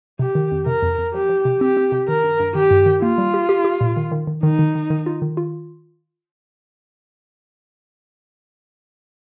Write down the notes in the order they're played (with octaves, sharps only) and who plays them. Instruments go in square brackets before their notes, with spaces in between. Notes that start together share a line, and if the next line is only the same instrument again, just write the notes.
[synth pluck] C3 [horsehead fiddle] G4
[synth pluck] D#3
F2
[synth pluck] C3 [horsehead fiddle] A#4
[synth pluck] F2
F2
[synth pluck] F3 [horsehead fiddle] G4
[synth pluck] F3
C3
[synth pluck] C4 [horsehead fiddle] G4
[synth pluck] C4
C3
[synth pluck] D#3 [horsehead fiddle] A#4
[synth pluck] G2
G2
[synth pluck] D#3 [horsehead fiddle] G4
[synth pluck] G2
D#3
[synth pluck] A#3 [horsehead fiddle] F4
[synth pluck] G3
G4
G4
G4
A#2
D#3
D#3
D#3
[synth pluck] D#3 [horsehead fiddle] D#4
[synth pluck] D#3
D#3
D#3
F4
D#3
F4